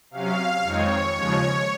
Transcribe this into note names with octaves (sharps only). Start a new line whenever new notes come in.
C3 F#3 C#4 F5
F2 D#3 G#3 C4 D#4 C#5
D#2 C#3 F3 G#3